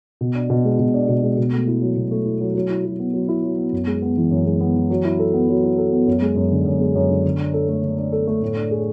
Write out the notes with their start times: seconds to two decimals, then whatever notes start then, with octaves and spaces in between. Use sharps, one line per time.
0.21 B2
0.35 D4
0.50 B2
0.65 G#3
0.79 B2
0.94 D4
1.09 B2
1.23 G#3
1.38 B2
1.52 A3
1.67 E4
1.82 F#3
1.96 B2
2.11 A3
2.25 E4
2.41 F#3
2.55 F#3
2.70 E4
2.85 F#3
2.99 B3
3.14 F#3
3.29 E4
3.43 F#3
3.58 B3
3.73 F#2
3.87 G#3
4.02 B3
4.17 E3
4.31 F#2
4.46 G#3
4.61 B3
4.76 E3
4.90 F#3
5.05 E4
5.19 A4
5.34 B3
5.49 F#3
5.63 E4
5.78 A4
5.92 B3
6.07 F#2
6.22 G#3
6.36 F#2
6.51 D3
6.66 F#2
6.81 G#3
6.95 F#2
7.10 D3
7.24 D3
7.39 D4
7.54 A4
7.69 A3
7.84 D3
7.98 D4
8.12 A4
8.27 A3
8.42 A2
8.56 D4
8.71 G#4